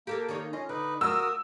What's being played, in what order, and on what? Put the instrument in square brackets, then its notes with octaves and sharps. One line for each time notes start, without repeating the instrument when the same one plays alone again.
[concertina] A#3 [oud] G4 A4 A#4
[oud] D#3 D#4 C#5
[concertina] C#4 [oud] F4 D#5
[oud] D3 [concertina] D#4 B4
[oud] F4 [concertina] F#4 A#4 D#6 [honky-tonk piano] E6